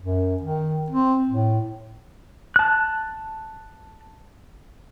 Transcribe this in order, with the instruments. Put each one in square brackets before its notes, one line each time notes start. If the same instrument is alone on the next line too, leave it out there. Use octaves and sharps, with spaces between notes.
[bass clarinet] F#2
D#3
C4
A2
[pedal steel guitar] A5 F#6